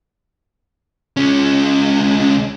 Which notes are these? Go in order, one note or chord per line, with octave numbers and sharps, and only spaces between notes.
C#2 C#4